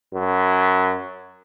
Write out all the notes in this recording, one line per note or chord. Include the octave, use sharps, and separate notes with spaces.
F#2